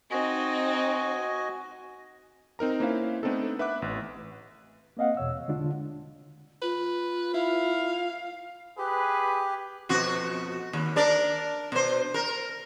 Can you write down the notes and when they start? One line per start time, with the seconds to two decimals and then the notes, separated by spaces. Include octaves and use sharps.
0.11 C4 D#4 F#4 D#5 G#5
2.59 C4 D#4 A#4 A#5
2.80 A#3 C#4 E4 B4 C5 F5
3.23 A3 B3 C4 D4 D#4 A4
3.59 B4 E5 F#5 D6 F#6
3.82 A1
4.97 A#3 C4 D#5 F5 F#5
5.17 E2 B2 C#5 E6
5.48 D3 G#3 D4 F4
6.62 F4 B4
7.34 E4 F5
8.78 G4 G#4 B4
9.89 F2 B2 F#4
10.73 D#2
10.96 D4 A#4 D5
11.72 B2 C5
12.14 A#4